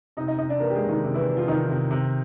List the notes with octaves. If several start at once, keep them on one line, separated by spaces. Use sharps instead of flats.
C3 D#4 D#5
D#4 D#5
C3 D#4 D#5
D4 D5
E3 A#3 A#4
G4
G#3 G#4
C3
D#3 D#4
C3
E3 E4
E3
F3 F4
C3 D#3 D#4
C3
C3